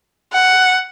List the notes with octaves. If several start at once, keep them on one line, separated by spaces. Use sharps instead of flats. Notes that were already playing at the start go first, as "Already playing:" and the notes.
F#5